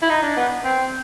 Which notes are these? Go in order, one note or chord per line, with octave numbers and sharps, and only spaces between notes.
E4
D#4
D4
B3
C4